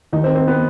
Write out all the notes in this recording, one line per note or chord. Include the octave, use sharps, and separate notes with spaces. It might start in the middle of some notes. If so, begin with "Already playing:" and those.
D#2 D#3 D#4
C4
C4
B3